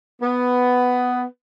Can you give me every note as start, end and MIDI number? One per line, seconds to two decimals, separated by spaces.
0.21 1.23 59